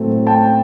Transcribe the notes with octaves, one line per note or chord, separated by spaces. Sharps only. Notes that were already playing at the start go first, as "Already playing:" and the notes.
Already playing: A2 F#3 A3 C4
G5 A5